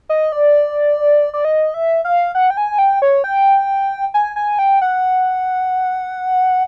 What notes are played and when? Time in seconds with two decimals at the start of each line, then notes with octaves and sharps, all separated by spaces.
0.09 D#5
0.32 D5
1.34 D5
1.45 D#5
1.74 E5
2.05 F5
2.35 F#5
2.50 G5
2.57 G#5
2.79 G5
3.02 C#5
3.24 G5
4.14 G#5
4.36 G#5
4.59 G5
4.82 F#5